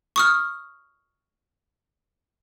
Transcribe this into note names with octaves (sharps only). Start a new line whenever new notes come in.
C#6 D#6 F6